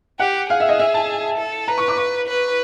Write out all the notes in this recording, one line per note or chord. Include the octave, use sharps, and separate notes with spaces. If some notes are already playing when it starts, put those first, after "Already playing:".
G4 F#5
G#4 F5
E5
D#5
E5
A5
A4
B4 A#5
C#6
D6
C#6
B4